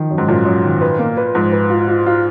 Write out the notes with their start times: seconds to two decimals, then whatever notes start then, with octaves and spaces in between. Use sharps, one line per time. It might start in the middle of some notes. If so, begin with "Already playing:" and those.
Already playing: D#3 F3
0.11 F#2
0.18 G#2
0.28 F#2 A#2
0.45 F#2
0.63 D#3
0.81 B4
0.99 A#3
1.17 B4
1.34 G#2 F3
1.52 B4
1.70 F4
1.88 F4
2.06 F4